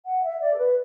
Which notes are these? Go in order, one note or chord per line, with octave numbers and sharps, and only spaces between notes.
F#5
E5
D5
A4
B4